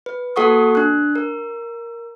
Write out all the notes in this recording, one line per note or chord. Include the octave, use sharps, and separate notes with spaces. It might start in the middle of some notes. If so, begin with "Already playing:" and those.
B4
A#3 F#4 A4 F#5 C#6 D#6
D4 F#6
A#4